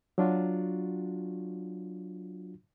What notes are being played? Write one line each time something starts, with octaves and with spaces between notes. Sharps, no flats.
F#3 D4 F4 F#4